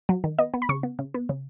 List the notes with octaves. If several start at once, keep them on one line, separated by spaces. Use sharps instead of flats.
F#3
D#3
B3 D#5
B3
B5
C#3 C#6
B3
C#3
B3
C#3